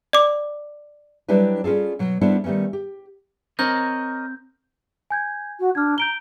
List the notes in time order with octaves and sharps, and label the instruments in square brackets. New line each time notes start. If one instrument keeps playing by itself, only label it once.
[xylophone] D5 D6
[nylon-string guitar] F#3 G3 D4 E4 G4 B4
G3 C#4 F4 G#4 A4
B2 F#3
G3 B3 D4 E4 A4 C5
D#3 G3 A3 B3 C#4
G4
[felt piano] C4 [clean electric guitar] A#4 C#5 D#5 [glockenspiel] G6
[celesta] G#5 G6 G#6
[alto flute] F#4
[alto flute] D4 [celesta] F6 G#6
[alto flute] A#5 [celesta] G6 D7 G7